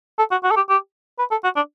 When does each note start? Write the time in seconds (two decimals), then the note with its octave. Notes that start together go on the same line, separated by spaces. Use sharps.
0.18 A4
0.31 F#4
0.44 F#4
0.51 A4
0.56 G4
0.69 G4
1.19 B4
1.31 A4
1.44 F#4
1.56 D4